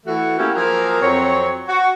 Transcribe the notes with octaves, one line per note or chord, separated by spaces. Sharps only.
E3 A3 F#4
A3 A#3 C#4 E4 F#4 G4
F3 F#3 A#3 G#4 A#4
F2 F#3 C4 C#5
F#4